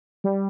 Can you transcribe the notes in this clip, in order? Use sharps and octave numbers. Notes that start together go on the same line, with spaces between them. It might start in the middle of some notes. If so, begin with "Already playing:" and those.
G3